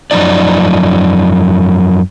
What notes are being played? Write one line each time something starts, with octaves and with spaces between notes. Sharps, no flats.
F#2 C3 F3 D#4 D5